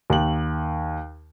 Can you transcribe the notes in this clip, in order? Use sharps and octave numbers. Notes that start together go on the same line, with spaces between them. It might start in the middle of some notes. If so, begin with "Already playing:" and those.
D#2 F#7